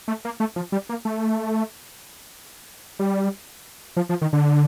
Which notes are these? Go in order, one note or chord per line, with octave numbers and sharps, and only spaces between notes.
A3
A#3
A3
F3
G3
A#3
A3
G3
F3
F3
D#3
D3